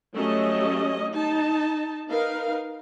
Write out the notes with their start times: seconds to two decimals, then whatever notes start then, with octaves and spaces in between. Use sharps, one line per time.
0.15 F#3 G3 A3 C#4 D#5
1.14 D#4 A5
2.10 D#4 A#4 B4 F5